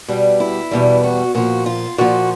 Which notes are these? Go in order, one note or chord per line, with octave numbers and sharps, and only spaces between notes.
B2 G3
E4
E2 B2 G3
F#4
A#2 F3 F#4
F4
A#2 F3 F#4